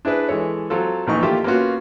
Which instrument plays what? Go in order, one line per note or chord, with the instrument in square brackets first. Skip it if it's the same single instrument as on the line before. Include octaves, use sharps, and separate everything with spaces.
[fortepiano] D4 E4 G#4 B4
E3 G#3 A4 C#5
F#3 C4 F4 A4
A#1 A#2 D#3 E3 D#4 C#6
A3 A#3 E4 F4 G4 E5
A#3 B3 C#4 F4 F#4